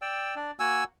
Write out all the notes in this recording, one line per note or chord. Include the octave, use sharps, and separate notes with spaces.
D5 G5 E6
D4 D5
A#3 F#4 F#5 G#5 E6